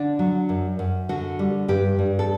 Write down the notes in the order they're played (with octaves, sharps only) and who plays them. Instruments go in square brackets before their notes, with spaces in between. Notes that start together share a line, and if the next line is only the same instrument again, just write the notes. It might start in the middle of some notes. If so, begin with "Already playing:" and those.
Already playing: [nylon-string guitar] D3 D4
F#3
F#2
F#2
D3 F#4
G3
G2 G4
G2
A4